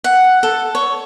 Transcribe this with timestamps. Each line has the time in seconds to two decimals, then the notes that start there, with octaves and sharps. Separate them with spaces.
0.04 F#5
0.43 A4
0.75 C#5